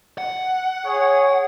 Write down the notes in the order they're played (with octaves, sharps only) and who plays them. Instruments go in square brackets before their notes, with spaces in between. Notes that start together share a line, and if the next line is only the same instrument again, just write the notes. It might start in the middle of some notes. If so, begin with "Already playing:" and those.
[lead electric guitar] F#5
[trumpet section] G#4 C#5